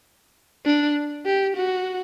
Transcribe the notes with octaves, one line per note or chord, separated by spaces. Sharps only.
D4
G4
F#4